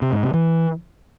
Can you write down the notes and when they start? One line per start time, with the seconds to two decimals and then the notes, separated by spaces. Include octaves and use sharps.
0.02 C3
0.12 G#2
0.23 C3
0.34 E3